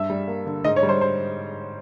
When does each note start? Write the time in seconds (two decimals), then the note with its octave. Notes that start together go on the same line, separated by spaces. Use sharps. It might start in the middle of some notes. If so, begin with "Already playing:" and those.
Already playing: G2 E5
0.10 G3
0.28 A#3
0.46 D3
0.64 G#2 D#5
0.76 C#5
0.83 G3
0.89 C5
1.01 C5